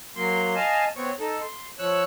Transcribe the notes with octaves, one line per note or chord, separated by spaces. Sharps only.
F#3 A#3 C6
D#5 F5 G#5 A5
B3 C4 C#5
D#4 A4
C6
F3 C#5 E6 F#6